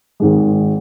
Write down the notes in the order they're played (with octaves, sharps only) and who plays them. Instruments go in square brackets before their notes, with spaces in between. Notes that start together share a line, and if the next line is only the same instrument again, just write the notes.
[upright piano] G#1 G#2 D#3 G#3